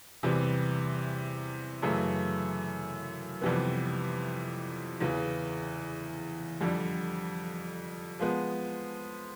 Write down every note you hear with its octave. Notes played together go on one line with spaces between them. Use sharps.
E2 C3 E3 G3
F#2 C#3 E3 A3
F2 C3 E3 G3 B3
E2 C#3 E3
F2 D3 G3
F3 G#3 B3